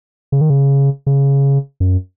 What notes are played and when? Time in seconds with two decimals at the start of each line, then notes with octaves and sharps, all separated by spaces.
0.32 C#3
0.41 D#3
0.50 C#3
1.06 C#3
1.80 F#2